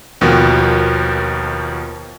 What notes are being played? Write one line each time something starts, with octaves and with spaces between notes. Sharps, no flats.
D#2 B2 D#3 F3 A#3 B3